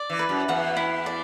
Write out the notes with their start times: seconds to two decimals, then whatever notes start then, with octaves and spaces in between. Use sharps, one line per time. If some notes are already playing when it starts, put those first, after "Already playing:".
Already playing: D5
0.10 E3
0.19 B4
0.29 F#2
0.48 E2 F#5
0.77 E4
1.06 D5